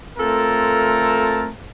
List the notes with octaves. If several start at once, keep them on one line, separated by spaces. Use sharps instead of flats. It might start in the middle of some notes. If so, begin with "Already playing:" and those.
A3 C4 F4 A4 A#4 A5